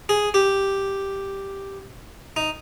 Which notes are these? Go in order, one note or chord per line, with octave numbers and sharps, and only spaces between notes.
G#4
G4
D#4